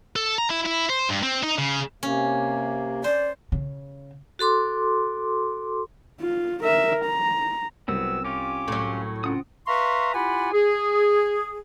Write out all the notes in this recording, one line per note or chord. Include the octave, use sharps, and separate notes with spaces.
A4
A#5
E4
E4
C5
G2
C4
D#4
C#3
C3 A#3 C#4
C5 D5
C#3
F#4 A4 C6 D6
F4
A#4 E5
A#5
C2 F#3 B3 C4 E6
C#4 F4 G4 D6
A2 F#3
C#3 C4 F4 F#5 D#6
B4 E5 F5 A#5 C6 C#6
E4 F4 G4 F#5 G#5 B5
G#4